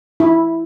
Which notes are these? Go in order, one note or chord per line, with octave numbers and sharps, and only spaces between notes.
E4